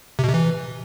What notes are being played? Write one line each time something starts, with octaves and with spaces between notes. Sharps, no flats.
C3
B2
C3
E3